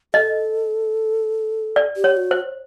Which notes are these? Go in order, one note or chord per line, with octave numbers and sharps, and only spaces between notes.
A4 D#5
D5
G4
C#5
F#4
C5